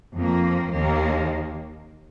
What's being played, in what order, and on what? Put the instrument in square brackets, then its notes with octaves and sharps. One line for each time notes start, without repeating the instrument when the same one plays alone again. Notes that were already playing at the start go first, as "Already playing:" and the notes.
[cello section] F2 F3 A#3
D#2 D#3 A#3